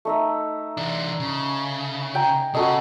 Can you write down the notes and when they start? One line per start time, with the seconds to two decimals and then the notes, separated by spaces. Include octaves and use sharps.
0.05 A3 D#4 E5
0.77 E3 D4
1.20 C#3
2.15 G5 G#5 A#5
2.54 C#3 F#4 A4 D#5